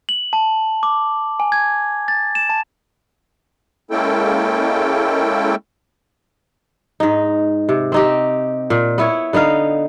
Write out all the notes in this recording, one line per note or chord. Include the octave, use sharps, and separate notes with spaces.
F#7
A5
D6
G#5
G#6
A6
E7
A5
G#3 A#3 C#4 E4 A4 G5
G#2 D#4
C3
C4 D#4 G4
A#2
B3 E4 C#5
D3 B3 D#4 F5